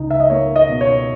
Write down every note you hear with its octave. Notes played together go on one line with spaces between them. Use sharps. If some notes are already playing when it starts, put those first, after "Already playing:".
Already playing: C#2 D#4
E5
D#5
A#3 C#5
D#5
B2
C#5